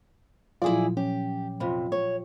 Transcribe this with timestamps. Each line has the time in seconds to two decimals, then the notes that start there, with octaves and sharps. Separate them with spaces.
0.62 A#2 F3 F#3 E4 F4 G#4 D5
0.97 C#4 G4
1.60 F2 C3 F4 F5 B5
1.92 C#5